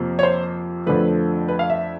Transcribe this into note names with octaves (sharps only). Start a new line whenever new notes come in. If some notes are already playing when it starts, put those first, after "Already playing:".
Already playing: F2 C3 F3 A#3
C#5
C5
F2 D3 F3 A3 B4
B4
F5
E5